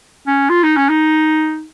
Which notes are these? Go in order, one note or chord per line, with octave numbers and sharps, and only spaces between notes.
C#4
F4
D#4
C#4
D#4